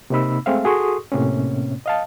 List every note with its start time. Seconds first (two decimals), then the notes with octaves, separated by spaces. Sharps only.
0.10 C3 A#3 C4 D#4 B5 E6
0.46 G#3 A3 C4 G#4 E5 F5
0.65 F#4 G#4 A4 C6 C#6 D#6
1.12 A2 C3 A#3 C4 C#4
1.86 D#5 F5 A5